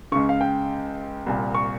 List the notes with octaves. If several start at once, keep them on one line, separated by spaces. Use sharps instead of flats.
C#2 C#3 C#6
F5
G5
C2 A#2
C#6